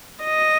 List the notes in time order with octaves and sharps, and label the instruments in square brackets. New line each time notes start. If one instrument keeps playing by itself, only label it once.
[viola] D#5